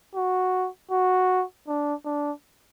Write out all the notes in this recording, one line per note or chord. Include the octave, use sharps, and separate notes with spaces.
F#4
F#4
D4
D4